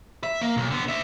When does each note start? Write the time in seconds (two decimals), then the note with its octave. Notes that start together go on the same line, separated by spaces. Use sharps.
0.23 E5
0.41 A#3
0.57 B1
0.71 D3 B3
0.89 D5 E5